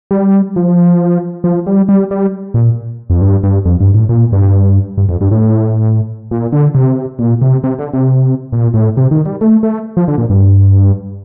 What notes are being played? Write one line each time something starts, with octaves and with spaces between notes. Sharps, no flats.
G3
F3
F3
G3
G3
G3
A#2
F2
G2
G2
F2
G2
A2
A#2
G2
G2
F2
G2
A2
A#2
D3
C3
A#2
C3
C3
D3
C3
A#2
A2
C3
D#3
G3
A3
A3
F3
D3
A#2
G2